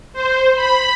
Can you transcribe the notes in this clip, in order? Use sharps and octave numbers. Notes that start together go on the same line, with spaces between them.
C5
B5